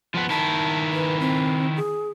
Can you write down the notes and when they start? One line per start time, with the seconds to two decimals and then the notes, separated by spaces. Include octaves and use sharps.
0.15 F3 B3
0.30 D#3 E4 A5
0.93 B4
1.20 C4
1.76 G#4